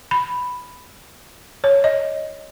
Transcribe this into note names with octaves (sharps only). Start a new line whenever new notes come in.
B5
C#5
D#5